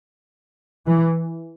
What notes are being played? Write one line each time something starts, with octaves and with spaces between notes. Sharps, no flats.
E3